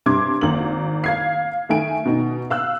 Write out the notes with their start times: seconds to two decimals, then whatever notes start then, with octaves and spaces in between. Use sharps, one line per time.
0.06 G2 C3 C6 D6 G#6
0.41 G#1 A#3 F#7
1.04 F5 G#6 C7
1.69 D#3 A3 G#5 D7
2.05 B2 D#4
2.50 F5 E6 F#6